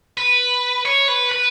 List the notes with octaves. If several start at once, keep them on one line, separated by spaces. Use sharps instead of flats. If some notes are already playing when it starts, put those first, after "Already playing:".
B4
C#5
B4
B4